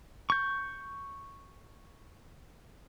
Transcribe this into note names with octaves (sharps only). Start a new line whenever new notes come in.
C#6 G6